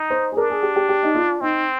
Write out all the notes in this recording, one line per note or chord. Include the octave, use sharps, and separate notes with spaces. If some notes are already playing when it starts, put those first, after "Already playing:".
Already playing: D#4
C5
G#4
D4 A#4
G#4
G4
G4
G4
D#4
F4
C4 D#4